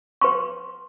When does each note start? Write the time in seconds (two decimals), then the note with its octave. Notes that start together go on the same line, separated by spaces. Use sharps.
0.21 B4 C6 C#6